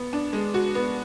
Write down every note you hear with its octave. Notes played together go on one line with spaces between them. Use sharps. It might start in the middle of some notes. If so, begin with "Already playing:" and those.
Already playing: B3
D4
G#3
F#4
B3